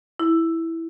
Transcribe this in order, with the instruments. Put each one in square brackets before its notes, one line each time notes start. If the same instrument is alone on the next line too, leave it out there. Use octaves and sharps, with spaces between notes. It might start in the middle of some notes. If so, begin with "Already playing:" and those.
[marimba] E4